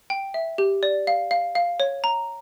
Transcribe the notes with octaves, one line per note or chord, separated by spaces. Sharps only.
G5
E5
G4
D5
F5
F5
F5
C#5
A#5